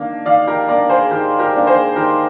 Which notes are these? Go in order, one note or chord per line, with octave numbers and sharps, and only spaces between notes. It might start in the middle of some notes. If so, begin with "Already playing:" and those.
Already playing: D#3 A#3 D4 D5 F5
D#3 D5 F5
G4 A#4
A#3 D4 A#4 D5
G#4 C5
D#3 G4 A#4
G4 A#4
A#3 D4
G#4 C5
D#3 G4 A#4